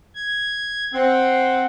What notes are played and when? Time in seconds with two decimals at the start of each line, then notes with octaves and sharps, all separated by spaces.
0.15 G#6
0.94 C4 F#5